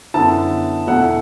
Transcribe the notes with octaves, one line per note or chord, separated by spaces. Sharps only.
F#2 D3 B3 E4 A5
E2 B2 A3 E4 F#5